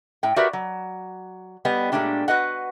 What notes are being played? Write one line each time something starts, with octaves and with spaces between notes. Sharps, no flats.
A2 G5
F#4 G4 A#4 B4 D5 E5
F#3
G3 B3 D#5
A#2 G#3 A3 D4 G4
F#4 B4 D#5 F#5